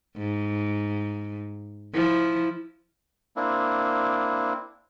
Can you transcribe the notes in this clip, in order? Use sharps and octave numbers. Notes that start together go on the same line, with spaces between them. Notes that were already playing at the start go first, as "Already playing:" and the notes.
G#2
F3 E4
A#3 C4 D4 E4